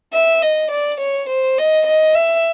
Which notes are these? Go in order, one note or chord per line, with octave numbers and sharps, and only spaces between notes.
E5
D#5
D5
C#5
C5
D#5
D#5
E5